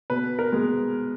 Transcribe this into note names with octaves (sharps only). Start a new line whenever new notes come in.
B2 B4
A#4
G#3 B3